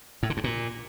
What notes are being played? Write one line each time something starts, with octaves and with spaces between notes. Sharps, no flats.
A2
D3
G2
A#2